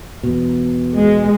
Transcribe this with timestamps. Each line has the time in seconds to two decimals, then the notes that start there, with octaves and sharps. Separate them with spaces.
0.23 E2 B2
0.95 G#3